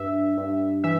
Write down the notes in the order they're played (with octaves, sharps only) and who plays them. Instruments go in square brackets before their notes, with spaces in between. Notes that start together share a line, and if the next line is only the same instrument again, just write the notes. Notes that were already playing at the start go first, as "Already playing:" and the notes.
Already playing: [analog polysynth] G2 E5
G2
E3 E5